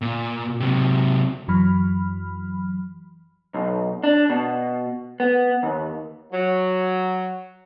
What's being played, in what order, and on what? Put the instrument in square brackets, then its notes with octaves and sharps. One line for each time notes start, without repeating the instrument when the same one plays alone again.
[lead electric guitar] A#2
C3 F#3
[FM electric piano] F#2 E3 F#3 B5 F6
[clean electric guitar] B1
D4
B2
B3
D#2
[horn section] F#3